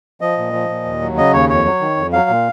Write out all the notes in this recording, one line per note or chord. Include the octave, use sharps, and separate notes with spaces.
F3 D#5
A#2
F3
A#2
D#2
F#3
C#3 D#5
D#2 C#5
F2 C#5
F#3
D#3
F2
F#3 F5
A#2